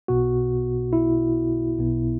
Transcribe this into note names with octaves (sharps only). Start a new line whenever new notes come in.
B1 B2 B3 F#4
E4
B1 B2 B3